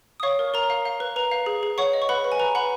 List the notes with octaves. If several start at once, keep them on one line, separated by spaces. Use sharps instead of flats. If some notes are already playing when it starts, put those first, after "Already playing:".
D#6
C#5 F5 C#6
A#4
A#4 A#5
F5
F5
B4
B4 A#5
F5
G#4
G#4
C#5 F#5 C#6
D#5
C#6
B4 F#5 B5
B4
G#5
B4 A#5
B4 F#5 B5